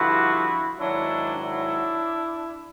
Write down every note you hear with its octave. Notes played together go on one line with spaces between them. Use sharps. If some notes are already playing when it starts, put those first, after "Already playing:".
Already playing: G2 D3 F3 E4 F#4
G#2 D#3 F#3 D4 E4
D4 E4